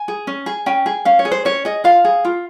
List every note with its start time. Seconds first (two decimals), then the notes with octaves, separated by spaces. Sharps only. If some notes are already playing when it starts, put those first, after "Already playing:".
Already playing: G#5
0.08 G#4
0.27 C#4
0.46 G#4
0.66 C#4 G5
0.86 G#4
1.05 C#4 F5
1.19 C#5
1.25 G#4
1.32 C5
1.45 C#4 C#5
1.65 G#4 D#5
1.84 F4 F5
2.05 G#4
2.25 F4